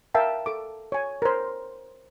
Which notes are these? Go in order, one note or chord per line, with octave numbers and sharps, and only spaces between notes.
A#4 E5 F5 G5 A5
A4 D6
C#5 G#5
A#4 C5